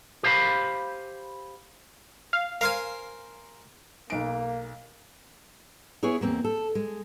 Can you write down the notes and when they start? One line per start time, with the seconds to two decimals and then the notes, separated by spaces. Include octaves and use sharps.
0.23 G4 C5 F5 A#5 B5
2.33 F5
2.61 A#4 C5 F5 G#5
4.10 B1 A#3 D7
6.03 B3 E4 G#4 C#5
6.21 E2 A#3 C4
6.44 A4
6.75 G#3